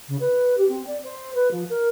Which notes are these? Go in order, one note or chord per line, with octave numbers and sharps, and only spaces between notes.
C#3
B4
G4
C4
D5
C5
B4
F3
A#4